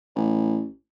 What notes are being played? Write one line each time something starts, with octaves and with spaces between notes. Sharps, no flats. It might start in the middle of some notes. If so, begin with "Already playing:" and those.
A1